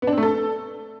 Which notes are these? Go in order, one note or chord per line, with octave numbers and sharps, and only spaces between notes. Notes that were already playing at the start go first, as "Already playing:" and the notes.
B3
D4
C4
A3
A4